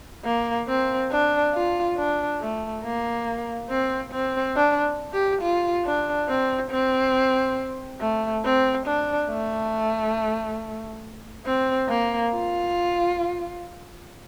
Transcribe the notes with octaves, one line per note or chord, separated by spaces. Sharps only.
A#3
C4
D4
F4
D4
A3
A#3
C4
C4
D4
G4
F4
D4
C4
C4
A3
C4
D4
A3
C4
A#3
F4